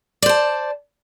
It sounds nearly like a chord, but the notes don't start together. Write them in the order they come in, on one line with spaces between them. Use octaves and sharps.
D5 C5 A5